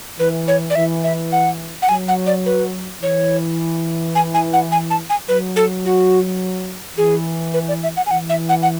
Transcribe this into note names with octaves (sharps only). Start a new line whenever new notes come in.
E3 B4
C#5
D5
E3 E5
E5
F#5
F#5
F#3 G#5
F#5
D5
B4
E3 C#5
G#5
G#5
F#5
G#5
A5
G#5
F#3 B4
A4
F#4
E3 G#4
B4
D5
E5
F#5
G#5
E3 F#5
E5
F#5
F#5